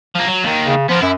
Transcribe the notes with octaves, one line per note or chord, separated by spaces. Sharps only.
F3 A#3
F#3
D#2 D#3
C#3
F3 B3 A#4
F#2 E4